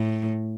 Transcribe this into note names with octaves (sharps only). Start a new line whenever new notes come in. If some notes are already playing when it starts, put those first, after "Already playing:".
Already playing: A2